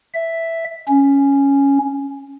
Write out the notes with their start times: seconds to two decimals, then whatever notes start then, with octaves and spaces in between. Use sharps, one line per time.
0.14 E5
0.88 C#4